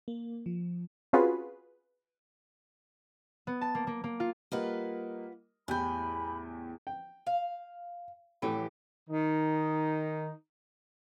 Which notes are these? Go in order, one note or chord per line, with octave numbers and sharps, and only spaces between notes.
A#3
F3
C4 C#4 F4 F#4 G#4 B4
B3
A5
A#3
A#3
A#3
F4
G3 A#3 F4 B4 D#5 F#5
E2 A2 G4 G#5 B5 G6
G5
F5
A2 E3 F#3 A3 G4
D#3 D#4